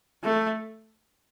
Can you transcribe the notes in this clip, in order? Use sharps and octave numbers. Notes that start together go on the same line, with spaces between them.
A3